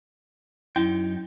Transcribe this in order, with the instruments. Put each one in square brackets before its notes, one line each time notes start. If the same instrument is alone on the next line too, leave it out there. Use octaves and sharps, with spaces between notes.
[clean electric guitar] F#2 D#4 G5 [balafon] E4